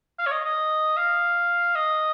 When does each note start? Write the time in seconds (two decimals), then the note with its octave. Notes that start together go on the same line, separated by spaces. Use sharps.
0.19 F5
0.26 C#5
0.32 D#5
0.45 D#5
0.97 F5
1.75 D#5